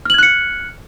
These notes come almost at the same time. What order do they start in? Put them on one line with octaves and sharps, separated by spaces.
F6 F#7 G#6 F#6 C#7